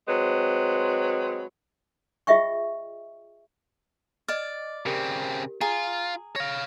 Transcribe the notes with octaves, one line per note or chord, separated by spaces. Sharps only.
F#3 G#3 C4 B4
F4 G#4 D#5 E5 G5 C#6
D5 D#5 F6
C#3 C4 G4 A#4
F4 G#4 A#5
C#5 F5 A#6